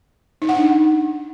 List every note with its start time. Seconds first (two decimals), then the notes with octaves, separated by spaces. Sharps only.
0.42 D#4
0.49 F#5
0.56 D4